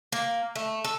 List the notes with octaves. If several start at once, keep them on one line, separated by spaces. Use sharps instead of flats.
A#3
A3
A4